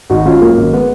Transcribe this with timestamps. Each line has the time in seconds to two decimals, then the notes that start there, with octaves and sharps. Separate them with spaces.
0.10 G#1 D#4 F#4
0.26 F3 C#4 F4
0.41 F#2 A#3 C#4
0.57 G#1
0.73 G#3 B3